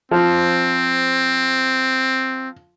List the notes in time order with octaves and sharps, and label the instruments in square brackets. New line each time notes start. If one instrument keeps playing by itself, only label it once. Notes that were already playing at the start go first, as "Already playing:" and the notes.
[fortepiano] F3 [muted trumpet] C4